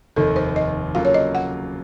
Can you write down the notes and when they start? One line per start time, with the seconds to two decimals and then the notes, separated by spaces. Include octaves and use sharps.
0.16 F1 D#2 D#3 A4
0.36 C5
0.56 D#5
0.95 C#3 F#3 A#3 F4 A4 F5
1.05 C#5
1.14 D#5
1.35 F#5